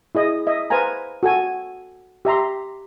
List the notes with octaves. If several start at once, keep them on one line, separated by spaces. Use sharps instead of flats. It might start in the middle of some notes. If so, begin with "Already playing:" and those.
E4 G#4 D#5 E5
D#5 E5
B4 C5 F5 G#5 A#5
F#4 A4 G#5
G4 E5 A#5 C6